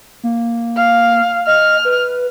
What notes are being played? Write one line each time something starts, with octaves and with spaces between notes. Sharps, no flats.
A#3
F5
D#5 F6
B4